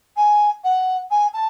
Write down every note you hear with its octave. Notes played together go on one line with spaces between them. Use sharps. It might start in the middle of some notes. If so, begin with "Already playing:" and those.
G#5
F#5
G#5
A5